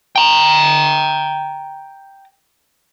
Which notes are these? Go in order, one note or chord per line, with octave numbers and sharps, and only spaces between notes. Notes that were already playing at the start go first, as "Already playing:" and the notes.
G5 A#5